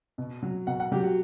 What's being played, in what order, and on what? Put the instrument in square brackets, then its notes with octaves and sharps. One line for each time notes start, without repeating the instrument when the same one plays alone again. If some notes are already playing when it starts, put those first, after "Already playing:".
[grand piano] B2
F#3
B2 F#5
F#5
F#3 G4
F#4